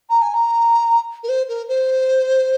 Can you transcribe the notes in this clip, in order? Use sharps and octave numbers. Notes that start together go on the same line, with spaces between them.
A#5
G#5
A#5
A#4
C5
A#4
C5